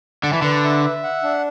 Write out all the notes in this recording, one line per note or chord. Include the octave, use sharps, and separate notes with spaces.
D3 A5
E3
D3 B4
E5
E5
F#5
D4